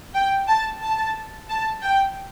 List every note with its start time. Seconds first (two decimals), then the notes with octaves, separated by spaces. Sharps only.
0.15 G5
0.48 A5
0.82 A5
1.49 A5
1.82 G5